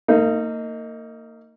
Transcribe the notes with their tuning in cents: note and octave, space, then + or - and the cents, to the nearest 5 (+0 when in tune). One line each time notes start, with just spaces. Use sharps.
A#3 -30 D#4 +10